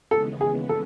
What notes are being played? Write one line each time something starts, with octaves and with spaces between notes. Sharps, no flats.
D#2 C#3 E3 G#3 B3 A4
G#4
A4